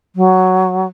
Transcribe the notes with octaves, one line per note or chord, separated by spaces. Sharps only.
F#3